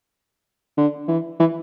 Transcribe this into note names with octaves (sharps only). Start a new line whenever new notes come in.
D3
E3
E3